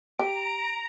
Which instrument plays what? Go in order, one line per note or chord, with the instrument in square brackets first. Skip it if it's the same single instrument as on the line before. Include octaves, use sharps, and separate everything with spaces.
[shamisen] G4 [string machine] A#5 [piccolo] D7